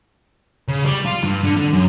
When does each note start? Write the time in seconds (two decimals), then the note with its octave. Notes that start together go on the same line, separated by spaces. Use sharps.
0.69 C#3
0.84 G3
1.05 F4
1.23 G2
1.43 D3
1.57 D3
1.73 F#2